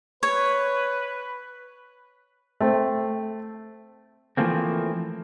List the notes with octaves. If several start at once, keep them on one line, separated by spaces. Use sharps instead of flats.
B4 C#5
A3 C4
E3 F3 A3 A#3 C4